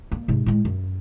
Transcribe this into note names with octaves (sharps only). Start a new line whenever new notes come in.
A#3
G#2 C3
A2 G#3
F#2